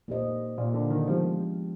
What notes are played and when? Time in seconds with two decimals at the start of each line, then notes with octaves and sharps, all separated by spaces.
0.08 A#2 A#3 D#4 G4 C5 D#5
0.58 A#2
0.74 D3
0.91 D#3
1.07 F3 G#3 B3 D4 G4